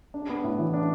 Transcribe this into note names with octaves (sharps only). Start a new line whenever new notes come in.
D4
B3
A2
E3
D4